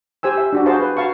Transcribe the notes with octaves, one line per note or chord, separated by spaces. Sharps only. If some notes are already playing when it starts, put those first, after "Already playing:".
G4 C5 G#5 E6
E5
D4 F#4 D5
F#4 G#4 C5 F5 A5
B4
F#4 F5 A5 C#6